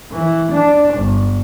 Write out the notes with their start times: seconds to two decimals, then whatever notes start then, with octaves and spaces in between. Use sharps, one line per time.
0.12 E3
0.52 D4
0.95 G1